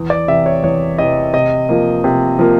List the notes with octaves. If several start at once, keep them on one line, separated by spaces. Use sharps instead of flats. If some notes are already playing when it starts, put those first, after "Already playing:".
Already playing: E2
D5
C3 E3 E5
C#5
E2 C#5
C3 E3 D#5
C3 D#5
F3 A#3
C3
F3 A#3